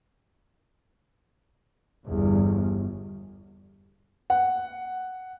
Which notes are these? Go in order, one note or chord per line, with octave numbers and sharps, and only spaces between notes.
G1 E2
F#5